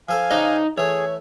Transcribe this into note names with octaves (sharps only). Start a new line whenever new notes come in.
F3 A4 C5 F5 G#5
C#3 D4 D#4 C5 D#5
E3 A3 G#4 C#5